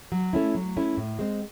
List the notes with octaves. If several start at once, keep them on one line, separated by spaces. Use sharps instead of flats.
F#3
A3 C#4 E4
F#3
A3 C#4 E4
A2
G#3 C4